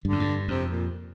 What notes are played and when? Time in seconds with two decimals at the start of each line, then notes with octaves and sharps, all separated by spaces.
0.04 G2 D3
0.12 F2
0.20 G2
0.48 F2 C3
0.70 A#2